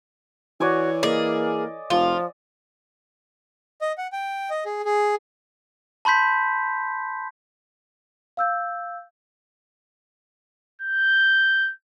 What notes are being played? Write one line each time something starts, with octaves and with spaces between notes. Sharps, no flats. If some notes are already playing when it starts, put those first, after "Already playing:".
E3 F#4 C#5 D5 G#5
A#3 G#4 D5 D#5
F1 F3 F4
D#5
F#5
G5
D#5
G#4
G#4
A5 B5 C6 G6 B6
F5 E6 G6
G6